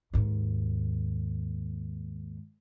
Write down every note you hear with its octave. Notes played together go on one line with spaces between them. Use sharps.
D#2 G#2